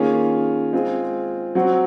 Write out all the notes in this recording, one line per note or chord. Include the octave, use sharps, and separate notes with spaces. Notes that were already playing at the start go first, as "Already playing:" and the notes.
Already playing: D#3 A#3 C#4 F4 G#4
G#3 C4 F4 G#4
F#3 C4 F#4